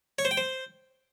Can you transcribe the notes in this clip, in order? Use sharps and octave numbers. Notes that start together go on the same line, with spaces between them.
C#5
C5
G5
C5